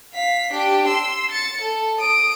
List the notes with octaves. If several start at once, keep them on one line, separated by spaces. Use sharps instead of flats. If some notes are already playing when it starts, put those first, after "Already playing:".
F5 B6
D4 G4
C6 E6
A6 C#7
A4
D#6 D7